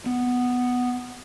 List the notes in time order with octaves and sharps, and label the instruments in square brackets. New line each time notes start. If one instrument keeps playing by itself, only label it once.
[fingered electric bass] B3